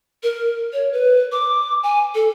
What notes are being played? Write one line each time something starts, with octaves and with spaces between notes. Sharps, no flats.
A#4
C#5
B4
D6
G#5
A4